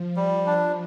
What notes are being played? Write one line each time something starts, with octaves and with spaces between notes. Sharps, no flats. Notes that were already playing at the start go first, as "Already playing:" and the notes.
Already playing: F3
G3
D4